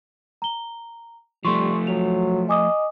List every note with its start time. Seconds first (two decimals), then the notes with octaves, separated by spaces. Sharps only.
0.42 A#5 G7
1.45 F3 G3 A3 C6 C#6
1.87 F#3 F7
2.49 D#5 G#5 D6 D#6